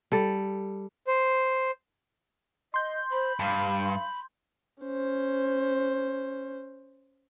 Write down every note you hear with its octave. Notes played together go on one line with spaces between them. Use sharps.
G3 A4
C5
D#5 C6 G6
C5 B5
G2 F5
C#4 C5